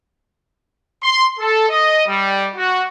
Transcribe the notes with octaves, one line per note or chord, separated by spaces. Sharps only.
C6
A4
D#5
G3
F#4